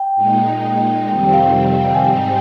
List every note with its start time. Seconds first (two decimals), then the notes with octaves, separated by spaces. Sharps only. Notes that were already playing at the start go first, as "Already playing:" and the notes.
Already playing: G5
0.15 A#2 G#3 D#4
1.09 F2 C3 D#3 G3 C4 G5
1.33 F5
1.95 G#5
2.04 G#2 G3 C4 D#4 G5